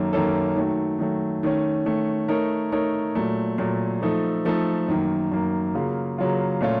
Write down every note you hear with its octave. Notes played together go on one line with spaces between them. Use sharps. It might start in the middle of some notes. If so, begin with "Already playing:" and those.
Already playing: F#2 D#3 A#3 C#4 A4
F#2 D#3 A#3 C#4 A4
D#3 F#3 A3
D#3 F#3 A3
D#3 A3 C#4
D#3 A3 C#4
A3 D#4 A#4 C#5
A3 D#4 A#4 C#5
A#2 F#3 A3
A#2 F#3 A3
F3 A3 D#4 A4
F3 A3 D#4 A4
F#2 D#3 A#3
F#2 D#3 A#3
C#3 F#3 A#3 F4
C#3 F#3 A#3 F4
A#2 A3 C#4 F4